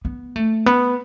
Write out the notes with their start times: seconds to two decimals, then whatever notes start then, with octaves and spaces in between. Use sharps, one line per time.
0.05 B3
0.36 A3
0.66 B3